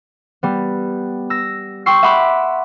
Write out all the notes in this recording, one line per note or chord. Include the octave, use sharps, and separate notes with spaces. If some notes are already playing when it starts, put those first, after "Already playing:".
G3 B3
E6 A#6
G5 C6 C#6 E6 C7
E5 F#5 B5 C6 D6